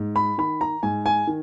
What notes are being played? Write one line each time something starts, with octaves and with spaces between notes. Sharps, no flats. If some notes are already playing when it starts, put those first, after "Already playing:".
Already playing: G#2
B5
D#3 B5
A#5
G#2 G#5
G#5
D#3